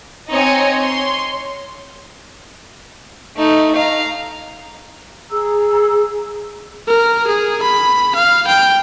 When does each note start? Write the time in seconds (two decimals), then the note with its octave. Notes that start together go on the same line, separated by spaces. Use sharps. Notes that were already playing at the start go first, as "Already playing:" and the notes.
0.30 C4 D#4 C#5 D#5 G#5 C#7
0.78 C#5 C6
3.37 A3 D#4
3.76 F5 A#5
5.30 G#4 A#5 E6
6.88 A#4
7.27 G#4
7.62 B5
8.15 F5
8.47 G5